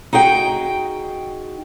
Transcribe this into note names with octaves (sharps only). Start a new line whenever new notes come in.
D#4 F#4 G#4 G5